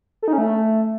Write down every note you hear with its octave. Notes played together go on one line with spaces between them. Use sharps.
A4
D#4
C#4
A3